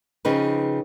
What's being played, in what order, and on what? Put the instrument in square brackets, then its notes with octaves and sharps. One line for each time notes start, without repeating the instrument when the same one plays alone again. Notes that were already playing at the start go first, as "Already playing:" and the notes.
[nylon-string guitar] C#3 F3 C4 D#4 B4